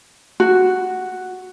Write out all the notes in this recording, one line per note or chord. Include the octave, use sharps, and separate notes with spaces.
F#4